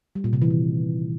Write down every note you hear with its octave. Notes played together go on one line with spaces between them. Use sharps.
G3
A#2
C3
E3
D#3